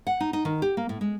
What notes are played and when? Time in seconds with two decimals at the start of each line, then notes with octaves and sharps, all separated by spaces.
0.07 F#5
0.21 D#4
0.33 D#4
0.45 D#3
0.62 G4
0.77 A#3
0.89 A2
1.01 G#3